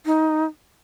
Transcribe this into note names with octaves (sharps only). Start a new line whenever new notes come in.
D#4